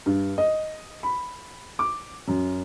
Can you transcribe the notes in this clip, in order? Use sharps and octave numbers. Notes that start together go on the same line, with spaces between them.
G2
D#5
B5
D6
F#2